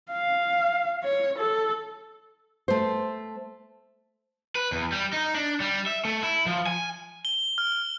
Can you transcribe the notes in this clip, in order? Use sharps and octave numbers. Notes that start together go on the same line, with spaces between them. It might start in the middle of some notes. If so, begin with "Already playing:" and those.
F5
C#5
A4
A3 C5
B4
E2
G3
D#4
D4
G3
E5
A3
E4
F3
G#5
G7
F6